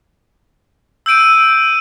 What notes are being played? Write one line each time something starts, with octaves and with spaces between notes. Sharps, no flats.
E6 G6 D7 D#7